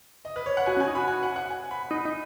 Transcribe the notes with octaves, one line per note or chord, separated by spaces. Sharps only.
D#5
B4
C#5
F#5
F#4 G#5
C#4
G#5
D#4
F#4 B5
G#5
F#5
F#5
G#5
B5
D#4 B5
D#4